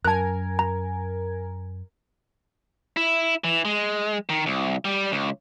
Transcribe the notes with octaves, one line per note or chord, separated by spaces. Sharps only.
F#2 A#4 G#5 A5 F#6
A#5
E4
E3
G#3
D#3
C2
G3
C#2